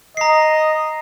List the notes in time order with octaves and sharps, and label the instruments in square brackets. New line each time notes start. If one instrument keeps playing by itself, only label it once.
[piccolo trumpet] D#5 [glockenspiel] A#5 C7